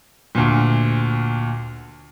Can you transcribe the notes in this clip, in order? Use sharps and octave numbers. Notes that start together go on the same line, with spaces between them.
D2 A#2